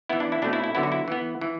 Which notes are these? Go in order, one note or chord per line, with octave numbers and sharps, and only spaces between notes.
E3 B3 E4
D4
E4
B2 A3 C4 D4
E4
E4
D3 F#3 B3 E4
F#4
E4
E3 B3
E3